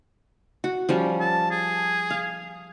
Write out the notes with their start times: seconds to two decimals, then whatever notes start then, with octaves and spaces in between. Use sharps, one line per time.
0.64 F#4
0.89 F3 G3 C#4
1.20 A5
1.51 G#4
2.10 F5